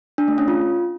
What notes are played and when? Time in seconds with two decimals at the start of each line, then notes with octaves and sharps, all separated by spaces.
0.18 D4
0.28 A3
0.38 C#4
0.48 F4